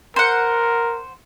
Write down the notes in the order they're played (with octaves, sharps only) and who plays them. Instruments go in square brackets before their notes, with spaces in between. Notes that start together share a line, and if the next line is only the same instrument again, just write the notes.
[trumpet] A#4 [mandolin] C5 F#5